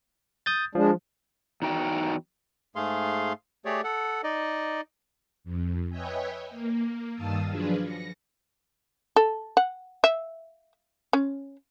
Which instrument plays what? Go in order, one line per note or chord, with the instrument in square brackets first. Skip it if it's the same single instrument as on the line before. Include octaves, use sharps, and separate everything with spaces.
[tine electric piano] D#6 G6 A6
[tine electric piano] F3 [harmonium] G#3 D4
[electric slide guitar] E2 D#4 F#4 G5
[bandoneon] G#2 A3 G#4 F5 C6
A3 G4 G#4 C#5 D5
A4 F#5
D#4 D5 D#5
[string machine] F2
B4 C#5 D#5 E5 G5 G#5
A#3
G2 D#3 F5 A5 D#6 E6
F3 F#3 D4 F4 G#4 B4
A#6 C#7
[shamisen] A4
F#5
E5
C#4